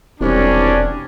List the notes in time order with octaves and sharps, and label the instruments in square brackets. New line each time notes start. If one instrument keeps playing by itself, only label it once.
[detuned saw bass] E1 [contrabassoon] C2 [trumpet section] G3 C#4 D4